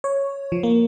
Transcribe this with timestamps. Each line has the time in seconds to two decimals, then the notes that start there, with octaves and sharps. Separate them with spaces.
0.04 C#5
0.52 F3
0.63 A#3